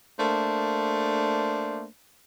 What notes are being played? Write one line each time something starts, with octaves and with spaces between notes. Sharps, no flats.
A3 A#3 D4 C5